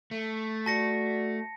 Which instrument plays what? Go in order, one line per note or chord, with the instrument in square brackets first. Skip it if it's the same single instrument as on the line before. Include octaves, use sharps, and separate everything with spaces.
[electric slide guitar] A3
[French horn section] F#4 D5 [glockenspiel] A5 A#6 C#7